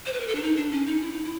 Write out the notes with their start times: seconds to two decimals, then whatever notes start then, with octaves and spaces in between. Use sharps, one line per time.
0.06 C5
0.13 B4
0.20 A#4
0.28 A4
0.35 D4
0.42 D#4
0.56 D4
0.72 C#4
0.86 D#4
1.01 E4
1.12 D#4
1.24 E4